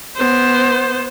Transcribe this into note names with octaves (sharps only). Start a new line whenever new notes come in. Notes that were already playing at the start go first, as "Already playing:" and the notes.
B3 C5